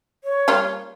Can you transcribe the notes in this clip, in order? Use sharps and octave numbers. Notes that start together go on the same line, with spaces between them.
C#5
G3 A#3 F4